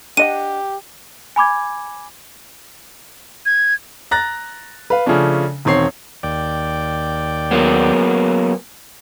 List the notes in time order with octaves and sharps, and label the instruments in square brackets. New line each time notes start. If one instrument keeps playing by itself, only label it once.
[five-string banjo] D4 D#5 F#5 [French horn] G4 [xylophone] D#7
[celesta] G#5 B5 D6 G#6
[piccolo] G#6
[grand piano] A#5 F#6 A6 A#6
B4 F5
C#3 F3 A3 C#4 D4
E1 D#3 C4 C#5 C7
[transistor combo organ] D#2 D5 G5
[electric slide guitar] F#3 A#3 B3